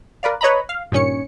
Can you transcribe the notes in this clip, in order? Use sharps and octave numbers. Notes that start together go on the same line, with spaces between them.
A#4 B4 D5 F5
B4 C#5 D#5 A#5 B5
F5
G2 A#2 D#3 C#4 C#5 C#7